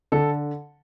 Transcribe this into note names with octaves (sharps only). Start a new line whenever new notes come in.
D3 A4